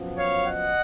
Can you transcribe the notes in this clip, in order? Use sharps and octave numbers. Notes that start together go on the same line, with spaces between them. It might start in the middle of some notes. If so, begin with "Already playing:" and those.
Already playing: F#2 F3 B3
C#5 F5
D#5 F#5